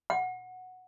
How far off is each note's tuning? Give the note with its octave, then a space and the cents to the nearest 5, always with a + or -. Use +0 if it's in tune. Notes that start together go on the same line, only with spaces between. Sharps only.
F#5 -5